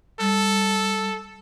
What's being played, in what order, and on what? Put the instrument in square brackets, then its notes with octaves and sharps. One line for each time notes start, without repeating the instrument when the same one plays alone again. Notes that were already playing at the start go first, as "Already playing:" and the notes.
[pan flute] G3 [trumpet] A4